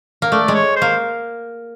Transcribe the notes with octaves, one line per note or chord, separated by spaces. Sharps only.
A#3
A3 D5
G#3
C#5
C5
A#3